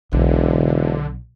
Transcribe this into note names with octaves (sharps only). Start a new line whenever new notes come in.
E1 B1 D3